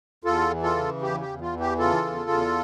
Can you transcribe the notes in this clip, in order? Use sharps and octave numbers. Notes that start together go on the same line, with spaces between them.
E2 F4 A4
E3
F4 A4
C#3
E2 G4
G4
E2
F4
E3
G4
C#3 F4 A4
E2
E2